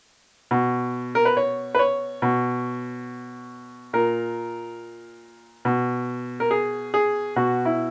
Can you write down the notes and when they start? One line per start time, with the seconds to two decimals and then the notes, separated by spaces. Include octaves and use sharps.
0.51 B2
1.15 A#4
1.25 B4
1.37 C#5
1.75 B4
1.79 C#5
2.22 B2
3.93 A#2 A#4
5.65 B2
6.40 A#4
6.51 G#4
6.94 G#4
7.36 B2 F#4
7.65 E4